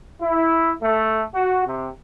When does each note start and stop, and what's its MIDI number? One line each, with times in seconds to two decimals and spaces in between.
0.21 0.72 64
0.82 1.22 57
1.34 1.62 66
1.66 1.88 48